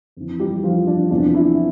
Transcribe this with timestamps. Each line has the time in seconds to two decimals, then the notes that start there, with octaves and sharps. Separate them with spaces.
0.17 F2 E3
0.40 G3 G4
0.63 F3 F4
0.87 D4
1.10 E2 C3 F3 D4
1.34 E4